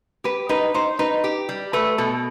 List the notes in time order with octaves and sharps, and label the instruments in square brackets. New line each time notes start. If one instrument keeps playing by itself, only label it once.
[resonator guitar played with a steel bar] G4 [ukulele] B4
[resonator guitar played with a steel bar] D#4 [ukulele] B4
[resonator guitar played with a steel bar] D#4 [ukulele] C5
[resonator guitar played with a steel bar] D#4 [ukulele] B4
[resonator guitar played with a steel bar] G4
G3
[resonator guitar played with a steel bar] A3 [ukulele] B4
[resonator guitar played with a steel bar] B2 [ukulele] A4